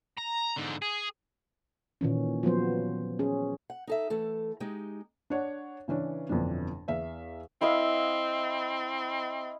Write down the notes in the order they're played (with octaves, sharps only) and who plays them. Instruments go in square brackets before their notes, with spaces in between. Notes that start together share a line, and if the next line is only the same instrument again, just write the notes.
[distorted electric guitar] A#5
G#2 D3
G#4
[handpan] A#2 D#3 E3 C#4
F3 F#3 B3 C5
C#4 G#4
[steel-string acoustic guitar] F#5
D#4 A4 E5
E3 A3 A4
G#3 D#4 G4
[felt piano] D4 C#5 F#5
C#3 E3 C#4 D4 B4
G1 F2 B2 E3 D4
E2 E5 F5
[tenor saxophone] C4 [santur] E4 D#5 F5